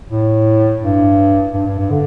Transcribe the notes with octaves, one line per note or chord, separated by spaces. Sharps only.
A2
G2
G2
G2
G2
D3